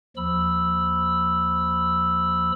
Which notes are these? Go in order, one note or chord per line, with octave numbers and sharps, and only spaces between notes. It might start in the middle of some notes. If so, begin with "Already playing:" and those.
D#2 F3 B5 E6